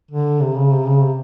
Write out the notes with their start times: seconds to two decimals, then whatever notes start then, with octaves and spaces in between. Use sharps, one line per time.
0.11 D3
0.41 C3
0.57 C#3
0.72 C3
0.87 C#3
1.01 C3